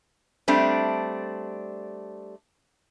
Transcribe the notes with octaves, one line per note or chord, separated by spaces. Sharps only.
G3 A3 C4 D4